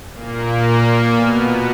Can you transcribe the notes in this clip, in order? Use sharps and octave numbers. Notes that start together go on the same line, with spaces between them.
A#2 A#3
B2 B3